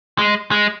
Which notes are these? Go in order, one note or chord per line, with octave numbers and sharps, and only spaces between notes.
G#3
G#3